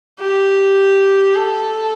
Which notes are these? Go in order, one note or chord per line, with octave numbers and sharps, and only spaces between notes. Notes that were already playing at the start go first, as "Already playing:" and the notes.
G4
A4